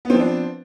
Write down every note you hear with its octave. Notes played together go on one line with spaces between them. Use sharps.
F3 B3 C4 D4